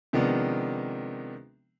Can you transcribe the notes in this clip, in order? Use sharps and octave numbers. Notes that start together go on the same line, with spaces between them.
C3 D#3 F3 G#3 B3 D4